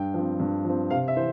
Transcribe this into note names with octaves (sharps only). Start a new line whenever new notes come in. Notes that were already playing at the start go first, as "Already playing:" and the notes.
Already playing: G2 G5
F3 C4
G2
F3 C4
C3 F5
E5
E3 C5